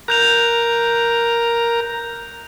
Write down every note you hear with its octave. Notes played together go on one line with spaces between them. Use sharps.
A#4 A#5 F#6 G6 F7